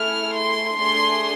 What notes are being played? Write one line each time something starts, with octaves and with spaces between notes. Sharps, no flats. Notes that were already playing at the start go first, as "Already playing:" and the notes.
Already playing: A3 E4 G#4 F6
C6
A3 D4 G#4 C6